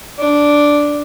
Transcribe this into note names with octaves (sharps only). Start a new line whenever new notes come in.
D4